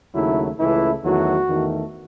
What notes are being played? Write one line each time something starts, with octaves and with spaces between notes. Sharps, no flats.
D#2 C#3 F#3 A3 E4
C#2 C#3 E3 A3 E4
E2 D#3 F#3 A3 F#4
E2 D#3 A3